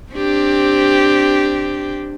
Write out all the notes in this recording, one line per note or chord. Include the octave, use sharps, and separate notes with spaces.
C4 D4 G4